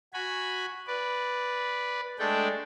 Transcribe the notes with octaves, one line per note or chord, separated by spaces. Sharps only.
F#4 G#5 B5
B4 D5
G#3 A3 D4 A4 D5 G5